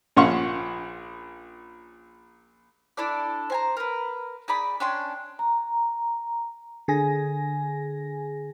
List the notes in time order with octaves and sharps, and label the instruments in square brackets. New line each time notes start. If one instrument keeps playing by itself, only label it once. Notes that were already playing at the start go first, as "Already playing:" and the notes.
[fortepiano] A#1 C#4 F5 F#5 C6 C#6
[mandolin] D4 E4 A4 D5
C5 G#5 A#5
A#4 B4
D#4 G#4 D5 B5
C#4 D4 G5 C6
[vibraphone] A#5
[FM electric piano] D3 G#4 G#5 A#6